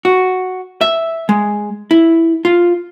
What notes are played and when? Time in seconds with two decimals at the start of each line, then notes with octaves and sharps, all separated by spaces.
0.05 F#4
0.81 E5
1.29 G#3
1.91 E4
2.45 F4